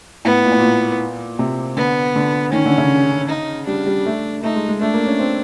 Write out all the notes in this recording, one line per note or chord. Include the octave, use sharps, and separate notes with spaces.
A2 B3
A#2
A2
A#2
C3
D3 B3
D3
D#3 C#4
D3
C#3
D#4
G3 D4
G3
A3
A3 D#4
G#3
G#3
A3 D4
A#3
C#4
C4